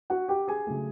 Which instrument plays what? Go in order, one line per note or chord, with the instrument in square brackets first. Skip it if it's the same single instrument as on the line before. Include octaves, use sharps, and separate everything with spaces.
[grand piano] F#4 F#5
G4 G5
G#4 G#5
C#3 F#3 A3